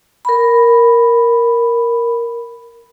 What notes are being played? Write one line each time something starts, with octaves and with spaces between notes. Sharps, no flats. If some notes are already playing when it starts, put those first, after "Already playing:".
A#4 B5